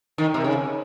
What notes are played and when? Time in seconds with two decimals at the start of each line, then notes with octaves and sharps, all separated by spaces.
0.18 D#3
0.34 C3
0.44 C#3